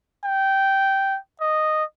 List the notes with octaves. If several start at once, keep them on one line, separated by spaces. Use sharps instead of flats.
G5
D#5